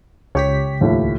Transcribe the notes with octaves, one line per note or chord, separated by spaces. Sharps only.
C#2 G4 C#5 B6
D#2 A2 F3